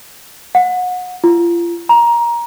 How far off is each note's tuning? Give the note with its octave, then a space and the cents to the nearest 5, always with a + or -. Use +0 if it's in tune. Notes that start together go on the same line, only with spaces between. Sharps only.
F#5 -30
F4 -35
A#5 +15